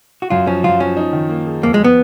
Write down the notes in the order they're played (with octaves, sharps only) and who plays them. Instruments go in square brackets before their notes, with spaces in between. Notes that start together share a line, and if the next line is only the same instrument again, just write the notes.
[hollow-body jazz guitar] F#4
[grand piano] F#2 [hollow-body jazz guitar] F4
[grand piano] F3 [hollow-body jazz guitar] C#4
[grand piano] F#2 [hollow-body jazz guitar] F4
[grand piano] F3 [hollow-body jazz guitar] C#4
[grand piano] D#4
D#3
A#3
G#4
[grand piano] F2 [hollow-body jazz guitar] A#3
[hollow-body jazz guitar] G#3
[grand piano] F3 [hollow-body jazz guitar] B3